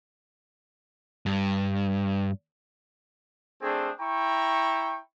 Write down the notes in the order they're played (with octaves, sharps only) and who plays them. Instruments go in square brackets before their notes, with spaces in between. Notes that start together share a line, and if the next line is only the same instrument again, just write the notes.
[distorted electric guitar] G2
[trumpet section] A3 C4 D4 G#4 C5
E4 G5 A#5 C#6